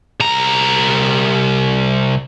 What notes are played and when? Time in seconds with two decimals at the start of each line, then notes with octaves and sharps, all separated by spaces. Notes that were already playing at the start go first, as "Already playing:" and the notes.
0.20 C2 A#5